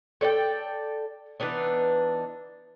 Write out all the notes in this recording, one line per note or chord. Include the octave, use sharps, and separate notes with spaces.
A4 D5 D#5 G5
E3 B3 D4 D#4